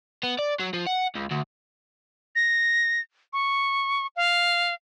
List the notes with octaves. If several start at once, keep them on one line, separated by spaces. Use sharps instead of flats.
B3
D5
F#3
F3
F#5
C#2
D2
A#6
C#6
F5